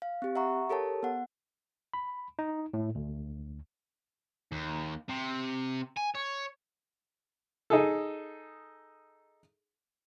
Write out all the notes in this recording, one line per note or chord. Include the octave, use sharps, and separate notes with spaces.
F5
C4 G4
E5 F#5 A#5 C#6
G4 A4 A#4 C#5 A5
B3 F#5
B5
D#4
A2
D2
D#2
C3
G#5
C#5
D#4 G#4 A4